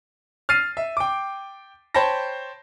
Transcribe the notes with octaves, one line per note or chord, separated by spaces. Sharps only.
F6 A6 C7 D#7
E5
G5 D6
C5 C#5 G5 A5 B5 A#6